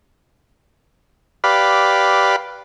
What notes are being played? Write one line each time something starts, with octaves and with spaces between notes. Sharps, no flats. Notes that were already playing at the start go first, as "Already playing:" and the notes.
G4 B4 D5 F5 B5